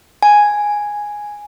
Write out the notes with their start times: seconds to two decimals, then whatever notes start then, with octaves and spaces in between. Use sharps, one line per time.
0.23 G#5